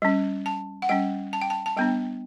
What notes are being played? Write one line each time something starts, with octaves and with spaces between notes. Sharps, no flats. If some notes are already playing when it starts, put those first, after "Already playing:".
G3 C#4
A5
F#5
G3 C#4 G5
A5
G5
A5
A5
G3 B3 D4 G5